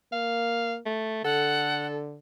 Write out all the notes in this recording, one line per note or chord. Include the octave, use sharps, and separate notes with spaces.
A#3 F5
A3
D3 A4 F#5